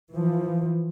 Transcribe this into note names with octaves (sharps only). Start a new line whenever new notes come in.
E3 F3